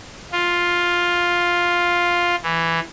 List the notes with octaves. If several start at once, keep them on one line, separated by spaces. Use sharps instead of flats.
F4
E3